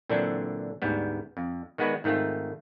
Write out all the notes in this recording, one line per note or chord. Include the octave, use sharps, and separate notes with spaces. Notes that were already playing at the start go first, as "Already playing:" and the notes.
A#2 D3 E3 F#3 C4 D4
D2 G#2 G3 B3
F2
D#3 G#3 B3 F#4 B4 D5
G#2 D#3 A3 C4 F4